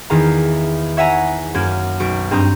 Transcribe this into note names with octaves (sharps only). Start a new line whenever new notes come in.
E2 D#3 F5 A#5
C#5 E5 F#5 G#5 A#5
F#2 A#3 G#6
B1 C#6 D7
G2 C4 A#5 D#6 G6